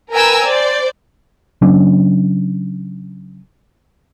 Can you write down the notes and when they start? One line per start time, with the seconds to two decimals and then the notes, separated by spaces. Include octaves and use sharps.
0.13 A#4 B4 G5 G#5 A#5 E6
0.44 C5 D5
1.62 C#3 F#3 C#4 D4